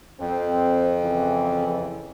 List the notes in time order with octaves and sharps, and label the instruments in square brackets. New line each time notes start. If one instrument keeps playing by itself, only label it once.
[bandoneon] F2 [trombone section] C4
[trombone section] C#3 E3